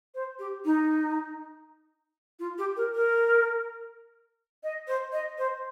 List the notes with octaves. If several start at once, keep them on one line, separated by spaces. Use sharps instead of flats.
C5
G4
D#4
F4
G4
A#4
A#4
D#5
C5
D#5
C5